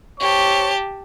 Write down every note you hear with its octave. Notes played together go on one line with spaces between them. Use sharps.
G4 C5 C#5 A5 C#6